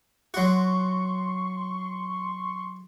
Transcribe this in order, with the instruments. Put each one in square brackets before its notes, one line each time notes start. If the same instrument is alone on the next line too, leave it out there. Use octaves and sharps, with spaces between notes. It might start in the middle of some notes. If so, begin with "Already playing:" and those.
[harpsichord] F#3 F#4 [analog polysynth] C6 C#6